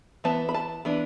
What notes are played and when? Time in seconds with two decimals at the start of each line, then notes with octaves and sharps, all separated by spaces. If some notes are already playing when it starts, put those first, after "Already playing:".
0.24 E3 B3 A5
0.49 B5
0.54 A5
0.85 E3 B3 D4